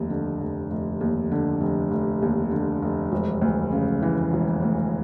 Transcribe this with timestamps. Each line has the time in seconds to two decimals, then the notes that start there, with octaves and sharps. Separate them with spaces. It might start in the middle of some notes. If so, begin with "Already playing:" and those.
Already playing: F1 D#2
0.10 D3
0.41 F1
0.71 F1
1.01 D#2
1.32 D3
1.61 F1
1.92 F1
2.22 D#2
2.51 D3
2.83 F1
3.12 E1
3.42 D2
3.72 C#3
4.02 E3
4.33 E1
4.62 D2